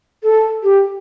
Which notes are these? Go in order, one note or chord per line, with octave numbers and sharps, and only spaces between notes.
A4
G4